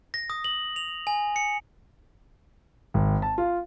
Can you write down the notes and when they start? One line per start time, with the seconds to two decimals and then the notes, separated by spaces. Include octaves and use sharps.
0.14 A#6
0.30 D#6
0.44 F#7
0.76 F7
1.07 G#5
1.36 C#7
2.94 G#1
3.22 A5
3.38 F4